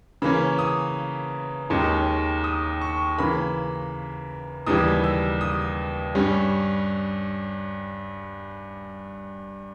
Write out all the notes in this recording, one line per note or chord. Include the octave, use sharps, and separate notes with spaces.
C#3 E3 A#3 C#4 B5
D#6
D#2 D#3 G#3 C#4
D#6
C#6
C#3 E3 A#3 B5
D#2 C#3 E3 G3 D#6
E6
D#6
G2 G3 C#4